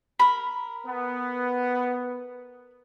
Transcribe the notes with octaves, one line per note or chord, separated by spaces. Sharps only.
A#4 B5
B3